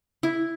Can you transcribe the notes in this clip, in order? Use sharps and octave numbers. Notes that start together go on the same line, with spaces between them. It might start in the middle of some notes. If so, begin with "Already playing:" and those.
E4